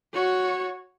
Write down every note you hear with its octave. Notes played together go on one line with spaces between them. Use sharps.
F#4 C#5